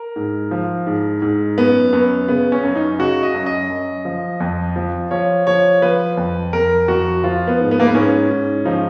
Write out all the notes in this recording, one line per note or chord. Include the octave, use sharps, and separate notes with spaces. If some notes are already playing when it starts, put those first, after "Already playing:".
Already playing: A#4
G#2
F3
G#2
G#2
F#2 B3
F#2 B3
C#3 B3
C#4
F#2
D#4
C#3 F#4
D#5
F#2
D#5
F#2
F3
F2
F3
F3 C#5
F3 C#5
F3 B4
F2
F2 A#4
F2 F#4
F3 F4
B3
G#2
B3
A#3
B3
G#2 C#4
G#2
F3 D#4